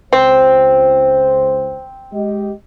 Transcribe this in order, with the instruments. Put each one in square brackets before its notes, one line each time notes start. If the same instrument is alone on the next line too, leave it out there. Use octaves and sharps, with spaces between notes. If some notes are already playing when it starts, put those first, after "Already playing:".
[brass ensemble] C#2 C5 [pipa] C4
[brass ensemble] G#3 G4 D#5